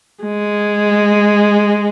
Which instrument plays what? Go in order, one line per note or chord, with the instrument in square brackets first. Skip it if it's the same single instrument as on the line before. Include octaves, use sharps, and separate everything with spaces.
[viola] G#3